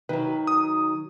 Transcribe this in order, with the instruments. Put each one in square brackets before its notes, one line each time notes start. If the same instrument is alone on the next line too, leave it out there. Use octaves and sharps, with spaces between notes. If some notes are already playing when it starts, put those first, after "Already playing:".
[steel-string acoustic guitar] D#3 F#3 [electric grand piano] B4
[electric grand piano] D#6